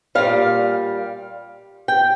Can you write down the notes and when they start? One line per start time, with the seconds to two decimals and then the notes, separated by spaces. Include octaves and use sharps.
0.15 A#2 G3 F5
1.88 G5